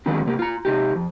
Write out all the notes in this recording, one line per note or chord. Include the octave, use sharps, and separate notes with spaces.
D#3 F#3 G#3 C4 D4
C3 A#3 G4
F4 A#5
C3 D#4 G4
F2